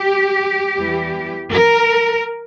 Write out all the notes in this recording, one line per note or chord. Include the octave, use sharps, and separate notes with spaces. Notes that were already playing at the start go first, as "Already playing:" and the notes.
Already playing: G4
E2 E3 G3
A#4